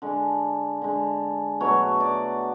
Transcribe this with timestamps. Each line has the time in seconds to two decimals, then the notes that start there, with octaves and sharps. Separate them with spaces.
0.02 D3 G#3
0.82 D3 G#3
1.60 B2 F#3 A3 C#5
2.00 D5